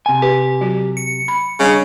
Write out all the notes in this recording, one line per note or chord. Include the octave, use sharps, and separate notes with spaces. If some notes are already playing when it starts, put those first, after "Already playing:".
C3 G#5
G4 B4
F#3 F#4
C#7
B5
C#3 G3 D4